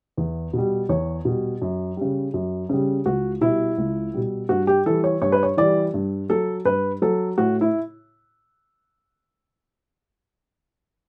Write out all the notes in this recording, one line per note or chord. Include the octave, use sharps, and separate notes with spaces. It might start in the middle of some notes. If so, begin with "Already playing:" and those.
E2
B2
G3
E2 C#5
B2 G3
F#2
C#3 G3
F#2
C#3 G3
C#2 F#4
B2 G3 E4
C#2
B2 G3
G2 F#4
G4
E3 G3 A4
C#5
G2 C#5
B4
C#5
E3 G3 D5
G2
F#3 A4
G2 B4
F#3 A4
A2 F#4
E4